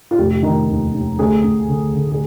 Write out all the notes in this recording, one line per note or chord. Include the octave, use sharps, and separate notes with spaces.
F4
F1 G4
D#3
D#2
D#2
D2 G#4
D2
D3
D3
G#4